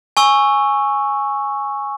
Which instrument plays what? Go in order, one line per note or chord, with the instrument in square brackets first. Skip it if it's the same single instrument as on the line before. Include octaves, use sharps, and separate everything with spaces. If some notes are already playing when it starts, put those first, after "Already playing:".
[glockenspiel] G#5 C#6 E6